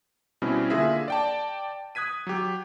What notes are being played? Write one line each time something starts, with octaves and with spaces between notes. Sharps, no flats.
B2 G3 C4 C#4 E4
D3 A#3 F4 G#4 E5 A#6
D5 G5 A5
D#6 F#6 G#6 B6 D#7
F#3 G4